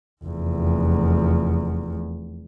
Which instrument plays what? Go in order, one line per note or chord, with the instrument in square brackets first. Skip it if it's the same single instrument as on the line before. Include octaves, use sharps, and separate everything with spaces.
[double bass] F1 E2